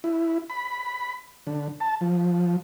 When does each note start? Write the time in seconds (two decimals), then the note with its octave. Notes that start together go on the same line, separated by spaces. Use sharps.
0.04 E4
0.50 B5
1.47 D3
1.80 A5
2.01 F3